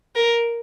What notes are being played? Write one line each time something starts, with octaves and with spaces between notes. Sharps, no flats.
A#4